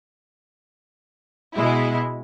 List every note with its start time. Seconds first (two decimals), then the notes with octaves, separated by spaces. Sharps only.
1.55 B2 G#3 E4